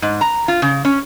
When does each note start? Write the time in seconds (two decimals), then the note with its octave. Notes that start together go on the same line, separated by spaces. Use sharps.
0.02 G#2
0.21 A#5
0.48 F4
0.62 C#3
0.85 C#4